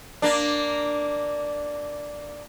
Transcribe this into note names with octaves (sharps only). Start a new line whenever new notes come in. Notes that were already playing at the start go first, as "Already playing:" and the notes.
A#3 D4